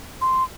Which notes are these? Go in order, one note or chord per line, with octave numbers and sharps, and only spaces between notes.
C6